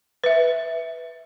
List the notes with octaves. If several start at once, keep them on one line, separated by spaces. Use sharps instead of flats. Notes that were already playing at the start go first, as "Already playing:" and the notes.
B4 E5